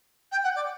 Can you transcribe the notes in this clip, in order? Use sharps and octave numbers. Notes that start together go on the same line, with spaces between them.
G5
F#5
D5